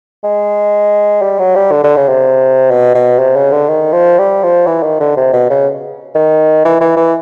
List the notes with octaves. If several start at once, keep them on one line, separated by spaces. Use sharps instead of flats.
G#3
G3
F#3
G3
D3
D3
C#3
C3
B2
B2
C3
C#3
D3
D#3
F3
G3
F3
E3
D#3
D3
C3
B2
C#3
D#3
E3
E3
E3